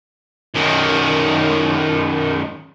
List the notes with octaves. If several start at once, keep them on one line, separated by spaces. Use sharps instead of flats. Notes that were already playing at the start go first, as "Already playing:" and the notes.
F#2 D#3